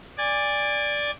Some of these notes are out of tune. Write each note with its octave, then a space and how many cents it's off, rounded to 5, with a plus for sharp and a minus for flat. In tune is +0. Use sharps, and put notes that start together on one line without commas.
D5 +0 G#5 -25